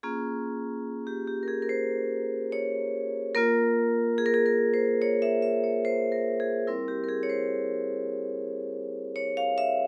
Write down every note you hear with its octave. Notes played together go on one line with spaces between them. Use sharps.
A#3 C#4 F4 G#4
G4
G4
A#4
G#4
A#4
C5
C#5
A#3 F4 A#4
G#4
A#4
G#4
A#4
C5
C#5
E5
E5
C#5
C5
A#4
G#4
G3 C4 E4 A#4
G4
A#4
G#4
C#5
C5
C#5
F5
E5